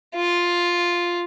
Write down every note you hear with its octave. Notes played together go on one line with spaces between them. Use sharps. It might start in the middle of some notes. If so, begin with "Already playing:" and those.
F4